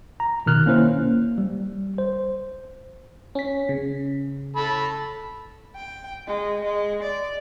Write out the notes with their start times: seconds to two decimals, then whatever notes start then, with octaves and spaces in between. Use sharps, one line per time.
0.20 A#5
0.46 B2 D#3 F6 F#6
0.66 A#3 C#4 E4 C5
0.98 A#3
1.38 G3
1.98 C5
3.35 C#4 B6
3.69 C#3
4.57 A4 B5
5.75 G5
6.26 G#3
6.64 G#3
7.02 D5